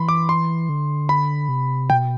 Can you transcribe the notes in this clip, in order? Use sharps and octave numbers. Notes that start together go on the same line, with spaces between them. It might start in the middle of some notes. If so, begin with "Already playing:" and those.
Already playing: E3 B5 C6
D6
C6
D3
B5
C3
B2 G5